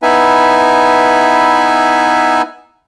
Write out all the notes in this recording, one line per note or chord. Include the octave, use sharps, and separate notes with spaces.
B3 D#4 E4 B4 E5 G#5